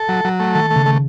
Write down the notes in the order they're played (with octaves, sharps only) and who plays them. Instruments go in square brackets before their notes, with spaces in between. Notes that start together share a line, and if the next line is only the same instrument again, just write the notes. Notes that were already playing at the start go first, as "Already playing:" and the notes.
Already playing: [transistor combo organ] A4
F#3
F#3
A3
[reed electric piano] D#3 [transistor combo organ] A4
[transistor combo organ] A3
[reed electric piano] C#3
[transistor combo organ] A3